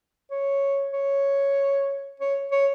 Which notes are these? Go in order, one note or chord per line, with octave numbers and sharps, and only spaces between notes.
C#5
C#5
C#5
C#5